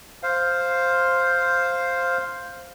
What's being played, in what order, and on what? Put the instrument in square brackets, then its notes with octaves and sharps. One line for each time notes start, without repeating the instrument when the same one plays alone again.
[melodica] C5 F5